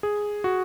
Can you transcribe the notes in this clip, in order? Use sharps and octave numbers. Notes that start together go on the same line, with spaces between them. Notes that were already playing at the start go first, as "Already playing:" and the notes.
G#4
F#4